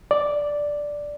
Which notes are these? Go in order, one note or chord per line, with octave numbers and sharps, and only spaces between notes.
D5